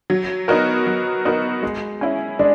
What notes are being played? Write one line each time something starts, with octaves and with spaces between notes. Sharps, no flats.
F#3
B3 D#4 F#4 A#4
F#3
B3 D#4 F#4 A#4
G#3
C#4 E4
G#3 D4